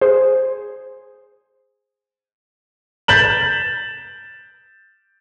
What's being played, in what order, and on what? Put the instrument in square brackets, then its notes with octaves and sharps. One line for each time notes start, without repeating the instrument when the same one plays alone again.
[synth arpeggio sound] G#4 C5
[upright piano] G6 A6 B6 E7 F#7